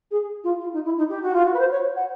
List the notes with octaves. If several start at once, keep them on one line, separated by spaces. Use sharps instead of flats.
G#4
F4
F4
D#4
E4
D#4
G4
F#4
F4
F#4
B4
C5
C#5
F#5